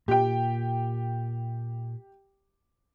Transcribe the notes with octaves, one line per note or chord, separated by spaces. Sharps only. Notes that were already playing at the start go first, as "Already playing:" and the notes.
A#2 G4 G5